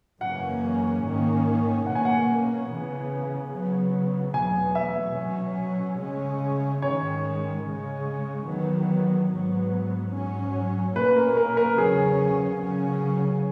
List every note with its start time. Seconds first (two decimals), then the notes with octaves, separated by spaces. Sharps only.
0.21 F#2 C#3 E3 A#3 C#4 F#5
1.03 G#2 D#3 A#3 C#4
1.86 B2 A#3 C#4 F#5
1.95 G#5
2.05 F#5
2.69 C#3 E3 B3
3.51 C#3 F#3 B3
4.34 E2 B2 F#3 B3 G#5
4.75 E5
5.17 B2 F#3 C#4
5.99 C#3 G#3 C#4
6.82 G#2 D#3 G#3 C#4 C#5
7.65 C#3 G#3 C#4
8.48 E2 D#3 F#3 B3
9.30 G#2 F#3 B3
10.13 G#2 F#3 C#4
10.95 B2 A#3 C#4 B4
11.16 A#4
11.37 A#4
11.57 A#4
11.78 E2 C#3 F#3 C#4 G#4
12.60 C#3 F#3 C#4